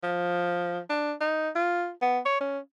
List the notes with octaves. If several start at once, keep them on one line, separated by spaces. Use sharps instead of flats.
F3
D4
D#4
F4
B3
C#5
C#4